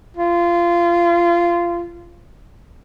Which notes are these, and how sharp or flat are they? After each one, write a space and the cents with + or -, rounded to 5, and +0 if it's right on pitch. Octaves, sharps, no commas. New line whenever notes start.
F4 -20